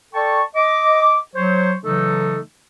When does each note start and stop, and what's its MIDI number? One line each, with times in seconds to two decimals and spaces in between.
0.14 0.42 69
0.14 0.42 74
0.14 0.42 79
0.14 0.42 81
0.14 0.42 85
0.55 1.18 75
0.55 1.18 86
1.35 1.75 54
1.35 1.75 72
1.35 1.75 73
1.83 2.39 49
1.83 2.39 52
1.83 2.39 54
1.83 2.39 57
1.83 2.39 63
1.83 2.39 69